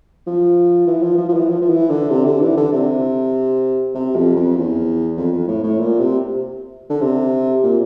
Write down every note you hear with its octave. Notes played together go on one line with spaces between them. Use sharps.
F3
E3
F3
F3
F3
E3
F3
F3
E3
D3
C3
D3
E3
D3
C3
C3
F2
F2
E2
F2
F2
A2
A2
A#2
C3
D3
C3
A#2